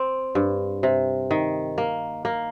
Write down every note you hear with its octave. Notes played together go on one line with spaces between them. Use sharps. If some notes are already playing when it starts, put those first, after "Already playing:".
Already playing: C4
G2
C3
D#3
A#3
A#3